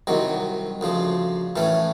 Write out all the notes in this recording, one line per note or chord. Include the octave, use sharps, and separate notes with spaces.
C2 C3 D#3 F#3
D2 C#3 F3
A2 E3 A3 C#4